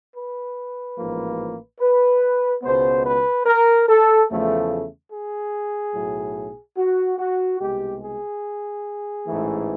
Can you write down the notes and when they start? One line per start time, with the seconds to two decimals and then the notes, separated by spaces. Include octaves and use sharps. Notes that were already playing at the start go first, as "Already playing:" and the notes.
0.15 B4
0.98 A1 G#2 F3 A#3
1.80 B4
2.63 C#2 B2 G#3 B3 C5
3.05 B4
3.46 A#4
3.88 A4
4.28 E2 C#3 F3 A3
5.11 G#4
5.94 B1 A2 F#3
6.77 F#4
7.18 F#4
7.60 C2 B2 G#3 G4
8.01 G#4
9.25 A1 G#2 E3 A3